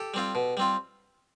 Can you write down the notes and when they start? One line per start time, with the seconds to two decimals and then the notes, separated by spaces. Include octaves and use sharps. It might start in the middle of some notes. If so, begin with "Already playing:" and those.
Already playing: G4 A4
0.14 G3 C4 F4
0.35 B2
0.57 G3 C4 F4